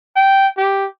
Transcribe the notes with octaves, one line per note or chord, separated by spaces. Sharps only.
G5
G4